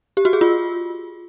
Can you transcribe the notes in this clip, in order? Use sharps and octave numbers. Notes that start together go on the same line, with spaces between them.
G4
F#4
G#4
F4